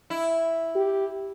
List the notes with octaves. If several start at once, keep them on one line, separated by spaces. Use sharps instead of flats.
E4
G4